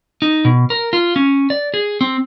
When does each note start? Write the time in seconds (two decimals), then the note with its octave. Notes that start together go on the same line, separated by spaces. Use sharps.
0.22 D#4
0.45 B2
0.70 A#4
0.93 F4
1.16 C#4
1.50 D5
1.74 G#4
2.01 C4